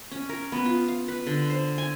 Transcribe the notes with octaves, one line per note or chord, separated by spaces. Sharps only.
C#4
A#4
B3
F4
F5
B4
D3
C5
G#5